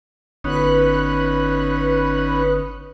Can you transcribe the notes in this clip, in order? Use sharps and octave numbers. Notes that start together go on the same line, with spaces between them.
G1 C#4 D#4 B4 B5 F#6